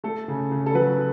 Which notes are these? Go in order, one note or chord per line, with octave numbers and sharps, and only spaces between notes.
A3 A4
C#3
C#3
A4
F#3 B4